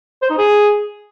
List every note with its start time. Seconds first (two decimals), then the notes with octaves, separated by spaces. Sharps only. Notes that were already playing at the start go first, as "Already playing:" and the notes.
0.22 C5
0.30 D#4
0.38 G#4